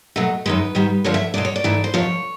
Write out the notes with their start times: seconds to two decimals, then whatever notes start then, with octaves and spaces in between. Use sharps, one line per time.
0.16 B2 F#3 A3 D#5
0.46 F#2 D#3 G#3 B4
0.75 G#2 D#3 G3
1.04 G2 D3 F3 G#3 C#5
1.14 E5
1.34 E2 B2 G#3 D5
1.45 C#5
1.56 D5
1.64 G#2 E3 A3
1.84 C5
1.94 F2 C3 F3 C#5